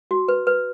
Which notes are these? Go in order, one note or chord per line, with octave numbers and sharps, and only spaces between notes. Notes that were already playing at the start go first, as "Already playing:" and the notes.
F#4
B4
B4